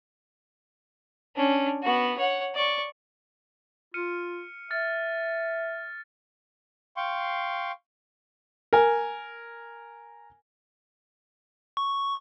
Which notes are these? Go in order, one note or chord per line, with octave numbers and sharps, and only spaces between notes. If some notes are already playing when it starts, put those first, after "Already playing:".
C#4 D4
B3 F#4
C#5 F#5
D5 C#6
F4 F6 C#7 D#7
E5 F6 A6
F5 G5 C6 C#6
A#4 G#5
C#6